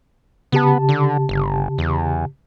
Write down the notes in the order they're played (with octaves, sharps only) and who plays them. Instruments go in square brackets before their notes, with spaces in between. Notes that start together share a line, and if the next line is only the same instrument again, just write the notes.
[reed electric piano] C#3 G4 A5 [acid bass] B3
[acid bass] D3
G1
E2